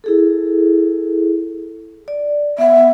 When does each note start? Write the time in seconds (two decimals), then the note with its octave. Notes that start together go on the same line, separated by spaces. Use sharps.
0.04 E4 G#4 A4
2.08 D5
2.58 B3 E5 F#5